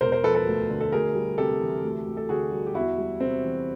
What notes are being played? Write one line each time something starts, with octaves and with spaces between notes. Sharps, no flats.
E1 A#4 C5
A#4 C5
F3 A4 B4
A4 B4
D2
D3
A4
D2 G#4 A#4
G3
C3 G4 A4
E3
D2
D2
A4
D3 F#4 G#4
G3
G4
E2 E4 F#4
G3
C3 C4
E3